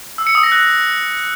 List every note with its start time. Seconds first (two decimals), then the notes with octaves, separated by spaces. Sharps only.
0.18 E6
0.27 C#7
0.35 D#6
0.43 A#6
0.52 F#6